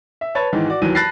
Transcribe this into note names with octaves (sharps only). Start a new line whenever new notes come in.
E5
B4 C#5 A5 A6
G#2 D#3 E3
F#4 D5
D#2 E3 F#3 D#7
A5 B5 F#6 A6 A#6 C7